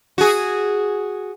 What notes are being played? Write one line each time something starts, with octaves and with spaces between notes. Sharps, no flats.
F#4 G#4